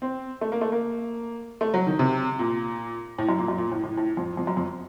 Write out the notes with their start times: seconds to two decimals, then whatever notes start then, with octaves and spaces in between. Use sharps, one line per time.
0.02 C4
0.41 A3
0.52 A#3
0.61 A3
0.72 A#3
1.61 A3
1.74 F#3
1.87 D#3
1.99 C3
2.39 A#2
3.18 A2
3.29 F#2
3.39 A#2
3.48 F#2
3.58 A#2
3.72 A2
3.84 A2
3.97 A2
4.17 F2
4.37 F2
4.47 F#2
4.57 F2